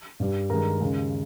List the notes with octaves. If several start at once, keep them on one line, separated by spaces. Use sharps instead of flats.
G2 G3
G2 D#3 G#3 A#4 A#5
D#2 C#3 G#3